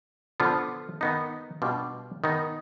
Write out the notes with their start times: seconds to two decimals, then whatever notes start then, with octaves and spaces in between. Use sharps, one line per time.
0.40 D3 F3 B3 F4
1.01 D#3 B3 D#4
1.62 B2 G3 D4 F4
2.24 D#3 B3 D#4